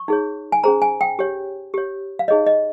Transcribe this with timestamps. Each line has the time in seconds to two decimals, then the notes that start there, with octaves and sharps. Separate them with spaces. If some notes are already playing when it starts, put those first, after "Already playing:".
Already playing: C#6
0.08 D#4 G#4 C#5
0.52 G#5
0.64 C#4 G#4 C5 A#5
0.82 G#5
1.01 G5
1.19 G4 C#5
1.74 G4 C#5
2.19 F5
2.28 D#4 G#4 C#5 D#5
2.47 D#5